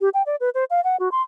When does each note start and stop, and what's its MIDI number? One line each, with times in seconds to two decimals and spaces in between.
0.01 0.09 67
0.14 0.23 79
0.26 0.36 74
0.41 0.50 71
0.55 0.64 72
0.70 0.81 77
0.84 0.96 78
1.00 1.09 66
1.12 1.22 84